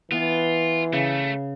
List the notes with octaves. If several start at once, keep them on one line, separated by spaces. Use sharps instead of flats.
E3 B3 F4
C#3 A3